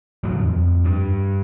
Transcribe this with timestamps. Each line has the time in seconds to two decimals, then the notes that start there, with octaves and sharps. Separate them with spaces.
0.24 D#2 A2 F3 F#3
0.41 F2
0.84 G2